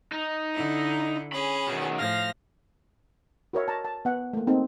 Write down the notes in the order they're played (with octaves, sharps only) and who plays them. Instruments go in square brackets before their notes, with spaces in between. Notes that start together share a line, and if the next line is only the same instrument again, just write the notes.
[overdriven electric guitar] D#4
[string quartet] D3 E4
[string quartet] C#4 G#4 [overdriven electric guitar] B5
[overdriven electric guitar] B2 D#3
[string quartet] A2 F3 A#6 [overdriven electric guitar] F5
[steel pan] F#4 A#4 C#5 E5
A5 A#5
A5
B3 F#5
A3 A#3
A#3 C4 D#4 A4